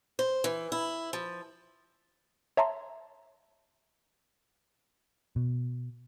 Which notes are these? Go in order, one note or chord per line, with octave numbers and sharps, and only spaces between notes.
C5
E3
E4
F3
C#5 E5 A5 A#5 C6
B2